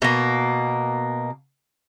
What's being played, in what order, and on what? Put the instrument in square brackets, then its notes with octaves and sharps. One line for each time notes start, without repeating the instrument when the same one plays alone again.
[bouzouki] B2 A#3